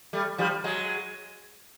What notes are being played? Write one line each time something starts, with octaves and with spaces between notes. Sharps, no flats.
G3 A3
F3 G3
F#3 G#3